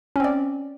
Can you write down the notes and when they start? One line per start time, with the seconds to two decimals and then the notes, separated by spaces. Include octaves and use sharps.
0.16 C#4
0.20 C4
0.24 D5